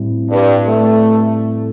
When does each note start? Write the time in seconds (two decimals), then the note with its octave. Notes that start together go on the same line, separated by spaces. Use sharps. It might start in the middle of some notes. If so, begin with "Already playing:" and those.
Already playing: A2 G3 C4 E4
0.30 G2
0.67 A3